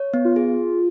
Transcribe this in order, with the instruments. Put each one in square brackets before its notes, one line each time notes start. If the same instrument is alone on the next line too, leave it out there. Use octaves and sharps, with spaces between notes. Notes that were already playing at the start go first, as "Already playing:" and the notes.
Already playing: [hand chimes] C#5
B3
[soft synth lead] F4
[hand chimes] G#4